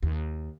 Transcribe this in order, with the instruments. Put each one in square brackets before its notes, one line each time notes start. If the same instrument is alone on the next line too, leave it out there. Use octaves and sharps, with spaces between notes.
[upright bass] D#2